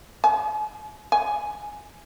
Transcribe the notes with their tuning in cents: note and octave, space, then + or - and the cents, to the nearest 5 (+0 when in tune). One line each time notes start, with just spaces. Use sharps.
G#5 +45
G#5 +5